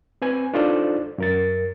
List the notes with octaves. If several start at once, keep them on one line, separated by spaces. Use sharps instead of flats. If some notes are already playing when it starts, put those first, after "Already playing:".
C4 B4 G#5
D4 D#4 F4 A4 C5 D5
F#2 A#4 A6